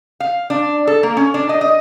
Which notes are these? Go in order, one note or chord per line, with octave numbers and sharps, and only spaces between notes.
F5
D4
A4
A#3
C#4
D4
D#5
D#5